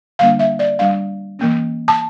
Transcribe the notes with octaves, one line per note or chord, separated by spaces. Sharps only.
D3 G3 A#3 D4 F5
E5
D5
G3 D4 F5
E3 A#3 C#4
A5